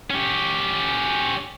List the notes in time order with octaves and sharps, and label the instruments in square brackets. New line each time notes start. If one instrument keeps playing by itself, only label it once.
[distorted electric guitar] C#4 G4